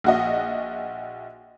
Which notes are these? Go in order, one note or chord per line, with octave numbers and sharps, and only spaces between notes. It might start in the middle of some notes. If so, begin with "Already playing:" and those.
A#1 F#4 D#5